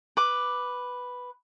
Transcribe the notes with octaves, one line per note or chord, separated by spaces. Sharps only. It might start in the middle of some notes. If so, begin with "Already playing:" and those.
B4 D6